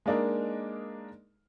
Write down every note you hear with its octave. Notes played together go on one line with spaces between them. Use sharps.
G#3 A#3 D4 D#4 A#4